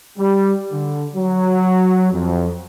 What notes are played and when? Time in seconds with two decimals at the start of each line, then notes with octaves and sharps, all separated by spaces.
0.18 G3
0.72 D3
1.16 F#3
2.13 F2